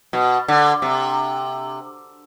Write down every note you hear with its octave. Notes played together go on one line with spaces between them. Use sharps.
B2
D3
C3